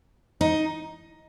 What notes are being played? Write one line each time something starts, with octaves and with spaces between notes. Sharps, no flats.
D#4